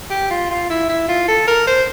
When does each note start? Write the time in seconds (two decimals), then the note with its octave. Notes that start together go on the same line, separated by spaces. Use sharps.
0.11 G4
0.31 F4
0.50 F4
0.70 E4
0.89 E4
1.09 F4
1.28 A4
1.48 A#4
1.67 C5